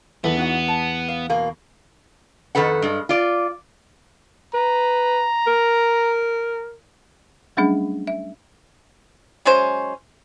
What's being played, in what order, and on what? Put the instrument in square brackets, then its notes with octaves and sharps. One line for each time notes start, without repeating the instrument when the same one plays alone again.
[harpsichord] E2 [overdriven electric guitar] B3 [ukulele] A4 B4 E5
[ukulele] D#4 F#4 F#5
A5
F5
[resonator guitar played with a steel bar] B2 A#3
F2 D#3 A4 B4 F#5
G2 G#3
F4 D5
[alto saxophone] B4 [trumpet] A#5
[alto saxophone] A#4
[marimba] F#3 G3 A3 C#4 D4 G#4
E5
[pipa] F#3 G#3 C#4 C5